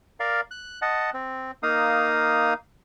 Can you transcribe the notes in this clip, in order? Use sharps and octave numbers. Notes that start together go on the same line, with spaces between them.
A#4 D5 F5
F#6
D#5 F#5 A5
C4
A#3 D#4 F5 D#6